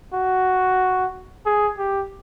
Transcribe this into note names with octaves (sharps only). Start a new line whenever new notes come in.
F#4
G#4
G4